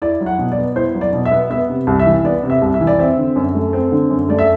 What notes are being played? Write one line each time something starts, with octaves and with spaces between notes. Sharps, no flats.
E4 D5
F#3
F#5
B2
D5
B3
E4 C5
F#3
D5
B2
E5
B3
B3 E5
C3
C2
E5
E3
B3 D5
C3
E5
C2
E5
E3
D5
C4 E5
D3
F#2
A3
C4
D3
F#2
A3 D5
E5